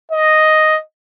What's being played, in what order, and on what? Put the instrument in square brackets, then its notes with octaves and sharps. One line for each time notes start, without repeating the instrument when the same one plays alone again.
[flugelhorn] D#5